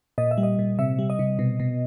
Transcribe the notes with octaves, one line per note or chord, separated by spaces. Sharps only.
A#2 D#5
E5
G3
D#5
A#2
C3 E5
G3
D#5
C3
B2
B2